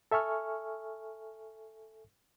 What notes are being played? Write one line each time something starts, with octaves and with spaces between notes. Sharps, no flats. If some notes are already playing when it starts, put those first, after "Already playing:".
A4 E5 G#5 C#6 F6